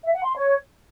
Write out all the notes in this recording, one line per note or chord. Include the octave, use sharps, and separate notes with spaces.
E5
F#5
C6
C#5